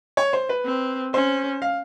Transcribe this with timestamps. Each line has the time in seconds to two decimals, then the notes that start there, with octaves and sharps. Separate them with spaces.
0.17 C#5
0.33 C5
0.49 B4
0.65 C4
1.13 C#4 C5
1.62 F5